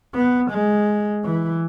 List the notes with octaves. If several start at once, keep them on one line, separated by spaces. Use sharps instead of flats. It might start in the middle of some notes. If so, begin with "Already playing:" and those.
B3
G#3
E3